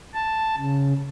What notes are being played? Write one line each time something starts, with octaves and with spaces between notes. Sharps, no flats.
A5
C#3